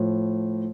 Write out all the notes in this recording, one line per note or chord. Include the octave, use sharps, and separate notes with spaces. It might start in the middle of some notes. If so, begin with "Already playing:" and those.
Already playing: A2 F3